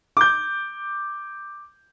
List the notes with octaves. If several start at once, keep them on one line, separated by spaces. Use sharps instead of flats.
D6 G6